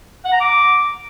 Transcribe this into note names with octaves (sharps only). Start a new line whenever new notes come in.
F#5
A#5
D6